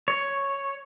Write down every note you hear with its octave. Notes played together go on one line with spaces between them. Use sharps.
C#5